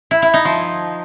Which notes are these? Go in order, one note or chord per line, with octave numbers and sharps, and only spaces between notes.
E4
E4
D#4
F3